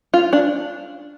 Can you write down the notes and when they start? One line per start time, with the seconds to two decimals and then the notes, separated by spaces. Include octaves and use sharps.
0.14 F4
0.33 D4